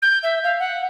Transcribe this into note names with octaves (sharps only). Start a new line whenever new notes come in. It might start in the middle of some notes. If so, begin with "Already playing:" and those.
G6
E5
F5
F#5